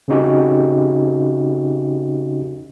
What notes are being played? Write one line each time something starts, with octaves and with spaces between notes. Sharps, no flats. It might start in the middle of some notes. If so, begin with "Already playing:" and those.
C#3 C4 C#4 D#4 F#4 G4